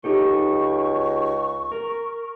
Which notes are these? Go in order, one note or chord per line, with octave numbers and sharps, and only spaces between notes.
C#2 D#4 G4 A4 C#6
A#4